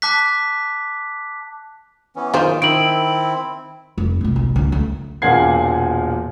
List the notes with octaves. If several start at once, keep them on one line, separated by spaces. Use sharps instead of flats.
A5 D6 F#6 B6
E3 B3 C#4
F#2 D#3 F4 C5
D#3 C4 E4 D7 F#7
F1
G#2 C3
B1 F2
C#2
A3
E1 A#2 A#3 F#5 G#6 C7